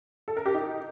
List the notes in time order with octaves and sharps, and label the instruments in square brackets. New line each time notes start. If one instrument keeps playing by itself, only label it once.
[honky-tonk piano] A4
A#4
G4
D#4